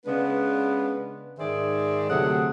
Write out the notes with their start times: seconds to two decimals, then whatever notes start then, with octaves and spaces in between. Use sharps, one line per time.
0.06 C#3 G#3 B3 D4 B4
1.39 G#2 D#3 G#4 C5 D5 E5
2.10 D2 C3 F#3 G#4 A4 F#5